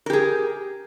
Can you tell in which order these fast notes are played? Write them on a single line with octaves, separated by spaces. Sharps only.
A#4 G4 G#4